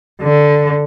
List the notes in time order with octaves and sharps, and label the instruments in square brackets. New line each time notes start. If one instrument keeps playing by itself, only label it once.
[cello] D3